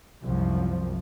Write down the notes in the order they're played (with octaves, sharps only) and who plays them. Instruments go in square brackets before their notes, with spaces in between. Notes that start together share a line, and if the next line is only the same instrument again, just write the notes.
[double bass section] C2 F#2 F3